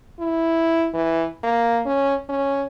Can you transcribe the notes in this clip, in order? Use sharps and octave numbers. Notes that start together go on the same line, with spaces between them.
E4
E3
A#3
C#4
C#4